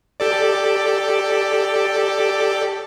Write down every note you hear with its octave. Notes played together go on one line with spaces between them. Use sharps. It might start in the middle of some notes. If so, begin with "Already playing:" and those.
G4 A4 D5